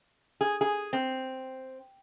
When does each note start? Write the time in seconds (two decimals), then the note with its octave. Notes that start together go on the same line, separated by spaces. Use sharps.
0.41 G#4
0.61 G#4
0.93 C4